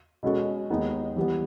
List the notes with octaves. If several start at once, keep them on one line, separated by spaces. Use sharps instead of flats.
B2 G#3 C#4 F#4 A4
D#2 D#3 G#3 B3 D#4
E3 G3 B3